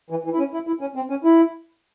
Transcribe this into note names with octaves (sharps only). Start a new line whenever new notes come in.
E3
E3
E4
C#4
E4
E4
C#4
C4
C#4
E4